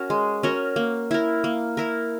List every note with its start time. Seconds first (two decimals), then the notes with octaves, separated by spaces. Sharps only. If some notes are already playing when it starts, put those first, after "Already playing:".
Already playing: C#4 F#4 A#4
0.10 G#3
0.43 C#4 F#4 A#4
0.76 A#3
1.11 E4 A#4
1.44 A#3
1.77 E4 A#4